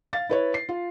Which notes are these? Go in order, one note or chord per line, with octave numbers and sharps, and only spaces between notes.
F5 A6
E4 B4 C#5
C7
F4